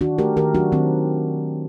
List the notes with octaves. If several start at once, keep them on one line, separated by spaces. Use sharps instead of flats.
D#3 D4 F#4
A3 G4 A#4
D#3 G4 A#4
F#3 D4 F#4
D#3 C4